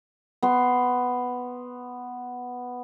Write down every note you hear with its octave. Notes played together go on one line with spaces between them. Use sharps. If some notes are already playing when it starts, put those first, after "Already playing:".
B3 C6